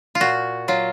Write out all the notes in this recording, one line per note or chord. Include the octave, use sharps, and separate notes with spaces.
F4
A#2 F#4
F#3 F4